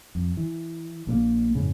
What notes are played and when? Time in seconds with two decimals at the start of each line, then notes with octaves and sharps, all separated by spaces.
0.15 F2
0.37 E3
1.07 A#1 A#2 E3 A#3
1.55 F2 G#2 C#3